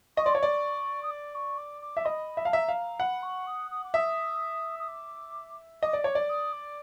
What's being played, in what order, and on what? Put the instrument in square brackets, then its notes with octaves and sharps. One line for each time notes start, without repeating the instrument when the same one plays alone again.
[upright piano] D#5 [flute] C#6
[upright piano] D5 [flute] C6
[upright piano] C#5 [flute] C#6
[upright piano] D5
[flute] D#6
D6
C#6
D6
D6
[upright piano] E5
[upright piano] D#5 [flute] B5
[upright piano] E5
[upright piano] F5 [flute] A5
[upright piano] E5 [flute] A#5
[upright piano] F5
[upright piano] F#5 [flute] B5
[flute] C#6
D#6
D#6
D6
[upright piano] E5 [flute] D#6
[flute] D#6
D6
[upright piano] D#5 [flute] D6
[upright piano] D5
[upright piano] C#5 [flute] D6
[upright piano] D5
[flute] D#6
D6